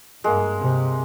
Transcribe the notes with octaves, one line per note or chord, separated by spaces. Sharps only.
G2 G#3 A#3
C3